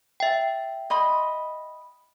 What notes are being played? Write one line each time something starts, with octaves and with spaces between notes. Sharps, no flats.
E5 G5
D#5 B5 C6